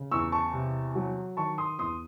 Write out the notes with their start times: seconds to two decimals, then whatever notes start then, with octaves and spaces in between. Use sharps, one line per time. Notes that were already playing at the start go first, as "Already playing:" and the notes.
Already playing: C#3
0.11 E2 C#6 E6
0.32 A5 C#6
0.53 C3
0.95 F#3
1.37 D#3 A5 C#6
1.58 C6 D#6
1.79 E2 C6 D#6